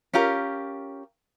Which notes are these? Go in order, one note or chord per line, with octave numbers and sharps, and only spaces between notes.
C#4 F4 G4 A#4